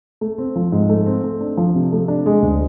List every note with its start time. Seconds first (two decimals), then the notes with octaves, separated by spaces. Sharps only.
0.21 A3
0.38 C4
0.56 F3
0.72 G#2
0.89 A3
1.06 C4
1.24 A3
1.40 D4
1.57 F3
1.74 C3
1.92 A3
2.08 D4
2.26 G#3
2.42 D2